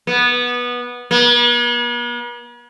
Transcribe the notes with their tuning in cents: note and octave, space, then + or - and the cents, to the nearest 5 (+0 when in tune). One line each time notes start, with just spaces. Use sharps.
B3 -15
B3 -45